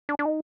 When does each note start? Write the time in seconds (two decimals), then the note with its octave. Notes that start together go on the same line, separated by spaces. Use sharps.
0.09 D4
0.19 D4
0.26 D#4